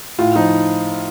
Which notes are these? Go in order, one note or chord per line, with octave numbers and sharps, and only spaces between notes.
A2 F4
F3 D#4